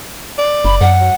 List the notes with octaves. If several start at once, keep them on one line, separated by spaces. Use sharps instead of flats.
D5
F#1 B5
F#2 F#5
F#3